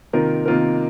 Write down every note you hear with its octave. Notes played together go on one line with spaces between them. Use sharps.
C3 D#3 A#3 F4 A#4
C3 D#3 A#3 F4 A#4